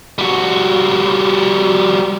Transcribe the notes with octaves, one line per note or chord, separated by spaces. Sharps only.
G3 F#4